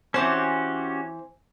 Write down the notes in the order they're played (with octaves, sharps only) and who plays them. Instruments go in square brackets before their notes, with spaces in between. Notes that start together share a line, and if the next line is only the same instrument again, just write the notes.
[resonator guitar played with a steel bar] E3 C4 C5 [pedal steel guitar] C#4 F#4 G4